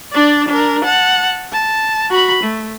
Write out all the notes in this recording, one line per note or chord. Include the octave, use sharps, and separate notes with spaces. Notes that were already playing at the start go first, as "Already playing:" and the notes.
D4 D5
D4 A#4
F#5 A5
A5
F#4 B5
A3